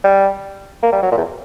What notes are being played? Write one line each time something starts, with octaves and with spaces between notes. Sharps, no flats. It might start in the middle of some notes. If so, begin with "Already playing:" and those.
G3
A#3
G3
F#3
A#2
E2